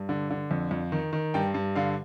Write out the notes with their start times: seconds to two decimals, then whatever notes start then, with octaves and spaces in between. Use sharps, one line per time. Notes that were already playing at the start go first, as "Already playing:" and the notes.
Already playing: G2
0.09 D3
0.31 D3
0.51 F2
0.71 F2
0.92 D#3
1.13 D#3
1.34 G2 G5
1.54 G2
1.75 D3 F5